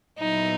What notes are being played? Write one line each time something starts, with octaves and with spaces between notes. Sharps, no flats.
A#2 F#3 B3 D#4 E4